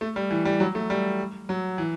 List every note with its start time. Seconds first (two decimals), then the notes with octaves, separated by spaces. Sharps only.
0.01 A3
0.16 G3
0.31 E3
0.45 G3
0.60 F#3
0.75 A3
0.90 G3
1.49 F#3
1.78 E3